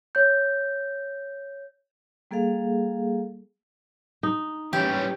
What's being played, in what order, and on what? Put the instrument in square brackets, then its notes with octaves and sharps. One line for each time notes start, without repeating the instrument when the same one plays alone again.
[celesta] C#5 G6
[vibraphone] G3 A#3 G#4 A4 F5
[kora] D#4
[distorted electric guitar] E3 G3 [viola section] C#4 [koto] G4